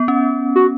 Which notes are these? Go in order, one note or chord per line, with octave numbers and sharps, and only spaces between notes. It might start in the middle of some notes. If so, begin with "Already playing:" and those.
Already playing: B3
C#4
F#4